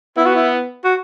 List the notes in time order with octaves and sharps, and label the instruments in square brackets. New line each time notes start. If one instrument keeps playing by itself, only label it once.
[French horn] B3 [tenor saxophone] E4
[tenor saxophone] F#4
E4
F#4